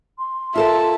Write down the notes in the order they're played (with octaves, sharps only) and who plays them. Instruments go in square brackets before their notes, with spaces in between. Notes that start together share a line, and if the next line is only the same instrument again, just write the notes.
[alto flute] C6
[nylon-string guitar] F4 A4 A#4 [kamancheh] E5 A5